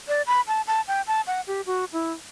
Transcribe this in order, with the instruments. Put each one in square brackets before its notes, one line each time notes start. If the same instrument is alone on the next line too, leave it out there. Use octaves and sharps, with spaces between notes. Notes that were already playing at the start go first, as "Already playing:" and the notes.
[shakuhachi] D5
B5
A5
A5
G5
A5
F#5
G4
F#4
E4